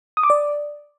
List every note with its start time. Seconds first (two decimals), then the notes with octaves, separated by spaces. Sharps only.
0.17 D#6
0.23 D6
0.30 D5